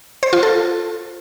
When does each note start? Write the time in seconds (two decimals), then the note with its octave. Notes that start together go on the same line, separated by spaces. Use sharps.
0.23 C5
0.33 F4
0.43 A4